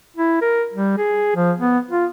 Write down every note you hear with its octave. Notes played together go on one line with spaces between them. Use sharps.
E4
A#4
G3
G#4
F3
B3
F4